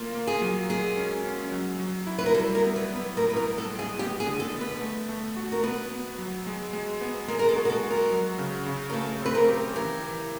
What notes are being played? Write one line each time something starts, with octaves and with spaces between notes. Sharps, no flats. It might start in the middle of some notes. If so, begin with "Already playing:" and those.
Already playing: A#3 F4
A#3
G#4
F#3
G#3 G#4
C#4
C#4
F#3
F#3
E4
B4
A#4
G3 A4
A#4
B3
B4
B3
B4
A2 A#4
B4
A#4
A2
A4
G#3
G#4
B3 G4
G#4
D3
A4
B3
B4
A3
A3
F#4
A#4
B3 B4
B3
F#3
G#3
G#3
B3
G#3 A#4
A#4
A4
F#4
A#4
A4
F#4
A#4
F#3
C#3
C#3
A#4
A3 A4
C4 B4
A#4
G4
E3 A#4
E3